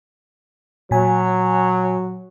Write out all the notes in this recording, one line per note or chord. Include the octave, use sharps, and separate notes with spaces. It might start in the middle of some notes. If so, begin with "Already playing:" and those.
A#2 F#3 G#5